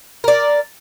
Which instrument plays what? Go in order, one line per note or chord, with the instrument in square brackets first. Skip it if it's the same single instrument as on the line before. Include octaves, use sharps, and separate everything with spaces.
[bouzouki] A#4 D5